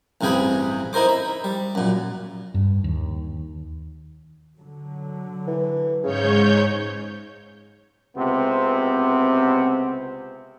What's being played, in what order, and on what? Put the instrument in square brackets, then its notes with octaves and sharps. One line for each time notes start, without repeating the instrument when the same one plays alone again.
[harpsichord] A1 G2 C3 G#4 G5 B5
D#4 E4 A#4 C5 D6
E5
G3
F#2 A#2
[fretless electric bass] G2
D#2
[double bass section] D3 F#3
[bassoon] E3
[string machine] G#2 C#5 G6 [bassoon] C#3
[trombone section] C#2 C3 B3 C4